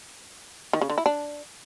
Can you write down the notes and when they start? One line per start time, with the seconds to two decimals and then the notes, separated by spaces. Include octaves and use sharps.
0.73 D#3
0.81 C#3
0.90 D3
0.98 E4
1.06 D4